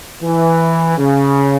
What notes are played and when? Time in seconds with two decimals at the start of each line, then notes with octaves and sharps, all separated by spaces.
0.22 E3
0.98 C#3